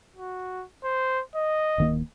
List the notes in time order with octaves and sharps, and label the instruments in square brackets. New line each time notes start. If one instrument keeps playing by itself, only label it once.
[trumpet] F#4
C5
D#5
[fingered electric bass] D1 D#3 A#3